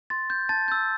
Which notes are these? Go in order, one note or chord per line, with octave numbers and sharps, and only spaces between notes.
C6 A6
G6
A5 A6
E6 G6